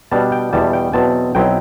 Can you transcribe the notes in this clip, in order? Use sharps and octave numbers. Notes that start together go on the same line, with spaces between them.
B2 G3 D4 A5
G5
E2 B2 G3 A5
G5
E2 B2 F#3 C4 A5
B1 B2 F#3 C4 E4 G5